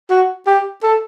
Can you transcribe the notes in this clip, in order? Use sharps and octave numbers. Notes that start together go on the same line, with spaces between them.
F#4
G4
A4